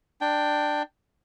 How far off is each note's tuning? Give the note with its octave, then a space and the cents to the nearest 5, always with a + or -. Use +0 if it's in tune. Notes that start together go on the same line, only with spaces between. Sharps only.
D4 +15 G5 +0